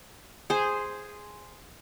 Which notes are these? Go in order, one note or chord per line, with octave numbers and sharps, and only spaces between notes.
G#4 C5